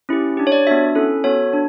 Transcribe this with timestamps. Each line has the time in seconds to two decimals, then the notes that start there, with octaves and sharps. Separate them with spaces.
0.09 C#4 E4 G4
0.37 D4 G4
0.47 C#5
0.52 D5
0.67 B3 D4 F#4 E5
0.95 C#4 E4 A4
1.24 B3 F#4 A4 C#5
1.53 D4